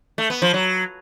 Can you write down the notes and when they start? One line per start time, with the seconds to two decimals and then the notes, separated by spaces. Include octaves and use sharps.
0.18 A3
0.30 B3
0.42 F3
0.54 F#3